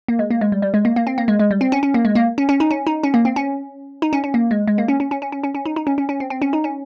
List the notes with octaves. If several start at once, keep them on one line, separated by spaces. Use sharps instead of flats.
A#3
G#3
A#3
G#3
G3
G3
G#3
A#3
A#3
C4
A#3
G#3
G#3
G3
C4
C#4
C#4
A#3
G#3
A#3
C#4
C#4
D#4
C#4
D#4
C#4
A#3
C4
C#4
D#4
C#4
C#4
A#3
G#3
G#3
A#3
C#4
C#4
C#4
C#4
C#4
C#4
C#4
D#4
D#4
C#4
C#4
C#4
C4
C4
C#4
D#4
C#4